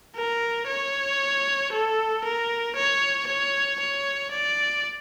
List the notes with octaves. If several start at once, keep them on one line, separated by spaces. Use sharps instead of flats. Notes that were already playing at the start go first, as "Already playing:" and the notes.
A#4
C#5
A4
A#4
C#5
C#5
C#5
D5